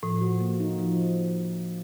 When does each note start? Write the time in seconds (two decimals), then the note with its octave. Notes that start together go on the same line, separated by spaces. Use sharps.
0.03 A2 F3
0.21 F#4
0.40 A#3
0.60 D#4
0.78 F3